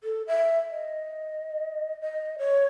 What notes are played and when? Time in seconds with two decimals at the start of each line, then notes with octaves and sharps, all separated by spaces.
0.04 A4
0.27 E5
0.71 D#5
2.01 D#5
2.39 C#5